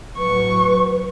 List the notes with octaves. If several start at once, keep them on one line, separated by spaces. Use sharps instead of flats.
A2 F#3 B4 C#6